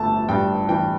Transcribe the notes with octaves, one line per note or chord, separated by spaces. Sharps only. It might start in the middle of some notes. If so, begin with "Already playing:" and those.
Already playing: G1 A3 A5
G2 G5
E3 G5